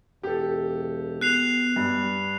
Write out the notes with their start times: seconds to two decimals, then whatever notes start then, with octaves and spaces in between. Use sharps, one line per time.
0.23 E1 G4 A4
1.21 B3 F#6 C7 F7
1.76 G2